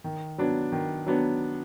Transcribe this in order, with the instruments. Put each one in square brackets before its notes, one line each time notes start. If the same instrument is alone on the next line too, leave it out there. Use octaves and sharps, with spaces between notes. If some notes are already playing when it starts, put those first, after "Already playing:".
[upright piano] D#3
F#3 B3 D4
D#3
F#3 B3 D4